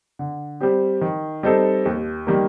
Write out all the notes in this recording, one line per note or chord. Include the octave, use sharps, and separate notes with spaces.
D3
G3 C4 G4
D#3
G3 C4 D#4 A4
D#2
D#3 G3 A#3